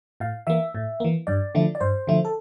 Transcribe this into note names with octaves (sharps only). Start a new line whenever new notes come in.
A2 F5
E3 A#3 E5
A2
E3 A#3
G2 D5
D3 F3 A3 E4
D5
G2 C5
D3 F3 A3 E4
A4